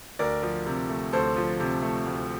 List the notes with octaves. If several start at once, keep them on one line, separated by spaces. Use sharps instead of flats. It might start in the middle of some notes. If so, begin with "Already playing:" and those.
D2 A#4 D5
F3
C3
A3
D2 A4 C5
F3
C3
A3
D2